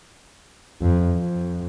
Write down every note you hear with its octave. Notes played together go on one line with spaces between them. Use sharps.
F2
F2